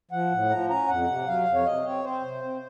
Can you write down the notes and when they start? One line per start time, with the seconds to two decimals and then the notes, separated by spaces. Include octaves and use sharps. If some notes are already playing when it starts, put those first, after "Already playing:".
0.11 F3 F#5
0.31 A2
0.50 F3 A#5
0.70 C#4 A#5
0.88 F2 F#5
1.07 C3
1.27 F#3 F5
1.46 F2
1.54 C#5
1.65 C3 D#5
1.84 C4 C#5
2.04 C4 C5
2.22 C3
2.42 C4